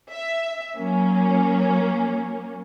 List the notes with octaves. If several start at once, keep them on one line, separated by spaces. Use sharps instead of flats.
E5
F#3 A#3 C#4